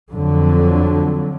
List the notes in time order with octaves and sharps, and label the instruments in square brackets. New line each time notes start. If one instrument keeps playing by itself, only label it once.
[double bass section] F2 D3 F#3